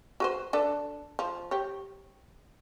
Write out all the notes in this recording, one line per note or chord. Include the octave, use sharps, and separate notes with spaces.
F#4 B4 C5
D4 A4 B4
F3
G4 C#5